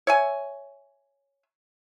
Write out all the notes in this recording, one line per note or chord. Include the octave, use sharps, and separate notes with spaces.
C#5 E5 G#5